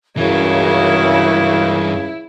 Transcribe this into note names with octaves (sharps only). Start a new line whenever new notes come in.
C#2 G2 C#3 E3 E4 F#4 A#4 C#5